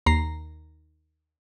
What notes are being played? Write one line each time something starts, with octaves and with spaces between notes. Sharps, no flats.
D#2 A#5 C7